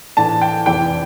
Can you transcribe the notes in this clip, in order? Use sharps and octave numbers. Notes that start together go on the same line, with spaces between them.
A#1 A2 E3 A5
G5
F1 E2 E3 G5